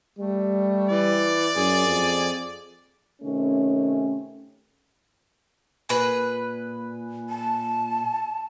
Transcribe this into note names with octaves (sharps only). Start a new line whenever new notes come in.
G3 A3
E3 D5
F#2 G#4
F2
C3 D#3 A3 C#4
A#2 G#4 B4
A5